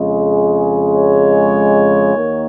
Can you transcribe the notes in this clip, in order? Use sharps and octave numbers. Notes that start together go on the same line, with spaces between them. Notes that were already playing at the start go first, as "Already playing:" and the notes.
Already playing: F2 C#3 G#3
C#5
D#2 D#3 A#3